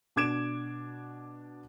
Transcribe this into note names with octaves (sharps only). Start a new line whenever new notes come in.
B2 D4 D6 G#6 D7 E7